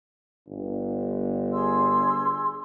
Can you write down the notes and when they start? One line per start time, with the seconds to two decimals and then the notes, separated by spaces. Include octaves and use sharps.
0.47 G1
1.51 G#4 C6 E6